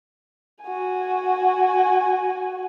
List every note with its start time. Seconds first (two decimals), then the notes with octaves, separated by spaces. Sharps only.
0.64 F#4 G#5